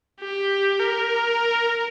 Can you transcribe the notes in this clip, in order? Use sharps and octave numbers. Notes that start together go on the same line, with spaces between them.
G4
A#4